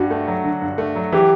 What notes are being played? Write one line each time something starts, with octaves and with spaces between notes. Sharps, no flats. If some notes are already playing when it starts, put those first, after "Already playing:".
Already playing: G2 F#4
A3
F#3
D3
G2
A3
F#3
E3 G4